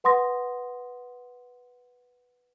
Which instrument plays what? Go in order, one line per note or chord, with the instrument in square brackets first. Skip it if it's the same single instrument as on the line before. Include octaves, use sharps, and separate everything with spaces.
[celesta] B4 F#5 C6 D#6 A#6